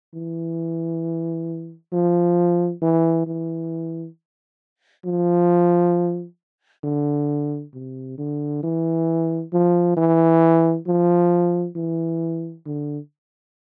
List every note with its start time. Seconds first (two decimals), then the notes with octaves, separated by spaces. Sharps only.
0.14 E3
1.93 F3
2.82 E3
3.27 E3
5.05 F3
6.84 D3
7.74 C3
8.18 D3
8.63 E3
9.53 F3
9.97 E3
10.87 F3
11.76 E3
12.66 D3